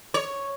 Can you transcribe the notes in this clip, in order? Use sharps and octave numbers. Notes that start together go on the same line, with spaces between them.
C#5